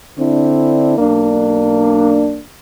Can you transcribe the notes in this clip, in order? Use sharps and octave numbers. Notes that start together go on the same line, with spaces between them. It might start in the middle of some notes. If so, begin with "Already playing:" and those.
D3 C4 D4 E4
B1 A#3 D4